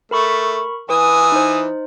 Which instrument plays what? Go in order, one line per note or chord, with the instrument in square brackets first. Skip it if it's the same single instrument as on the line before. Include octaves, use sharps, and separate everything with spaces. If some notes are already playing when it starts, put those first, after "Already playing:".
[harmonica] A3 [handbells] A#4 B5 C#6
[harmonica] E3 G#5 [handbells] B4 [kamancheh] D#6
[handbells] D#4 C5